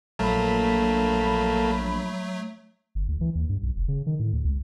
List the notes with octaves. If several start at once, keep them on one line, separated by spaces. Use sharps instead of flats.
A#1 F#3 A3 A#3 A4 B5
G1
D2
E3
D#2
G2
B1
F1
C#3
D#3
A2
D2
C#2